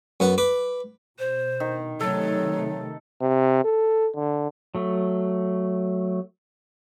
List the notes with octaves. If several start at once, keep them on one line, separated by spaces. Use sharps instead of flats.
F#2 B3 F#5
B4 D6
B2 C5
D#3
C3 D#3 F#3 A3 A4
C3
A4
D3
F#3 A3